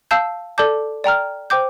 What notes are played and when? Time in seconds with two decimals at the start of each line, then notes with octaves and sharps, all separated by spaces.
0.11 F5 A5 E6 G6
0.58 A4 D5 A5 D6 G6
1.04 D5 G5 A#5 F6
1.50 C5 G5 D6 G6